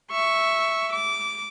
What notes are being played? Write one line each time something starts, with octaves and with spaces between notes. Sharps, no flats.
E5 C#6
D6